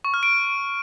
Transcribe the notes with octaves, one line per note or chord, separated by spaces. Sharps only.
C#6
F6
D7